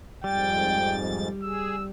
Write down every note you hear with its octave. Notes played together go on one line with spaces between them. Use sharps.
F2 G#2 G3 G5 A6
G#4 E6